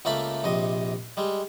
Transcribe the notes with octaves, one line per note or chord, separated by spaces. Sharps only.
C#2 A3 A#3 E5 A5 B5
A#1 C3 D#5
G3 G#3